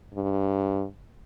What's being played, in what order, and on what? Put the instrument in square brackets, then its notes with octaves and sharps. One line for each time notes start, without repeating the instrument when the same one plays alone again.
[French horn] G2